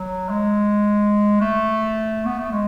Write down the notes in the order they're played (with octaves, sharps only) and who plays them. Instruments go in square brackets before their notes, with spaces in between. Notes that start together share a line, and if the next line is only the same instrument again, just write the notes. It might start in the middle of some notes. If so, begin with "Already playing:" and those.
Already playing: [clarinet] F#3
G#3
A3
B3
A3
G#3